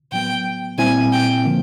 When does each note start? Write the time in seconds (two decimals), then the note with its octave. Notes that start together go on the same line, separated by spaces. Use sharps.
0.12 A2 F#3 B3 G5
0.78 A#2 G3 C4 E4 G#5
1.12 G5
1.45 D3 F3 A#3